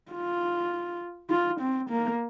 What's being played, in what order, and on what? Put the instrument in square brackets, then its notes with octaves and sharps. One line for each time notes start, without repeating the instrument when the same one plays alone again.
[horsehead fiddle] F4
F4
C4
A#3